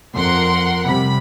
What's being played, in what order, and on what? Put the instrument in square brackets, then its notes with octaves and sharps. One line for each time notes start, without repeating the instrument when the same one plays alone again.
[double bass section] F2 [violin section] A#4 F#5 C6
[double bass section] C3 G3 [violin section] B5